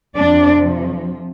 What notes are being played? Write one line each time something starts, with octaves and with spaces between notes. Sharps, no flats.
F2 C3 F3 D4 D5